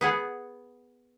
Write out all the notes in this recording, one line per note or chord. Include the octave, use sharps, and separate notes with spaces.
B3 G#4 F#5